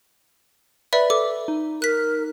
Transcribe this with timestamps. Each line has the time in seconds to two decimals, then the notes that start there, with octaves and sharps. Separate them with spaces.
0.93 B4 D5 E5 B5
1.10 A4 D6
1.48 D#4
1.82 A#4 F#6 B6